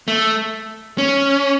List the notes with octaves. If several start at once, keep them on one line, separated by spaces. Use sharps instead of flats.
A3
C#4